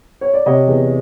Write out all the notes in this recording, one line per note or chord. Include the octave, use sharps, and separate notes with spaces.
C#5
D5
C3 C#5 D#5
E2